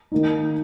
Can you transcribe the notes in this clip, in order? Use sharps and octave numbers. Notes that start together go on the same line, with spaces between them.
D#3 A#3 D#4